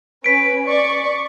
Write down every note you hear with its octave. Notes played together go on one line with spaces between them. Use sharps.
C#4 B4 B6 D7
D5 C#6